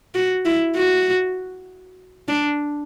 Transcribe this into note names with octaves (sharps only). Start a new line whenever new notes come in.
F#4
E4
F#4
D4